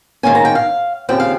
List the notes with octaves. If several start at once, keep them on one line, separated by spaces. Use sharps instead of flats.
G#2 D#3 A#3 C#4 G#5
A#5
G5
F5
D#2 C#3 F3 C4 G5
F5